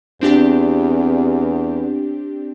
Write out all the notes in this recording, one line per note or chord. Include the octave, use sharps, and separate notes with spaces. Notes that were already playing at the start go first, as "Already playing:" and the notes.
E2 C4 D4 G4